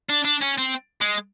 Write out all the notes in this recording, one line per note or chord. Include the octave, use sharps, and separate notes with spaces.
D4
D4
C#4
C4
G#3